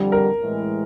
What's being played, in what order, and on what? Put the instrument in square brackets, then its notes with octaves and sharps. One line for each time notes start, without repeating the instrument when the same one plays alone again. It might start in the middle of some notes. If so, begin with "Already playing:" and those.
Already playing: [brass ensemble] F2 D3 G3
[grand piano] A#4
[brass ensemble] A2 E3 G#3